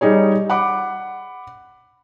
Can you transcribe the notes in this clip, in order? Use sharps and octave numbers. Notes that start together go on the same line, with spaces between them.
G3 D#4 G#4 C#5
F#5 B5 D6